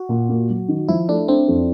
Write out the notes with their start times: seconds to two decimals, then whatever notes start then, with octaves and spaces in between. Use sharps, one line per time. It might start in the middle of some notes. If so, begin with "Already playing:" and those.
Already playing: F#4
0.09 A#2
0.29 A#3
0.49 F#3
0.68 D#3
0.88 F3 E4
1.09 A3 D4
1.28 C4 D4
1.48 F2